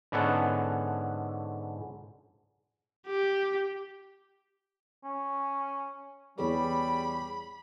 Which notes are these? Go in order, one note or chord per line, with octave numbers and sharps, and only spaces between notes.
G#2 D3 B3 C#4 A4 F#5
G4
C#4
E2 G3 G#4 C#5 B5